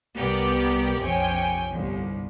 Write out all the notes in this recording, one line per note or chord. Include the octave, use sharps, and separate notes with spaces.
C2 B3 G4 A#4 D5
A#1 F2 C3 C#5 G5 G#5
G1 C2